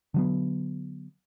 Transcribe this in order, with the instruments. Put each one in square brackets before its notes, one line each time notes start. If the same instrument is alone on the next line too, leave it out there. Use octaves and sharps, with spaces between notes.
[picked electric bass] D3 F#3 B3